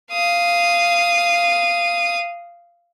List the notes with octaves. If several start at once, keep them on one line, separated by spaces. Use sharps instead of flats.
F5 D#6